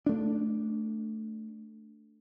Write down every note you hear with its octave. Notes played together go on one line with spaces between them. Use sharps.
A3 D4